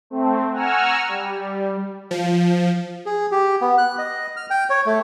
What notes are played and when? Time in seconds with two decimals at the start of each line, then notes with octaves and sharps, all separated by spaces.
0.10 A3 C4
0.52 F#5 G#5 A#5 C#6 E6 F6
1.08 G3
2.11 F3
3.06 G#4
3.31 G4
3.61 B3
3.78 F#6
3.98 D#5
4.37 F6
4.50 G5
4.70 C#5
4.86 A3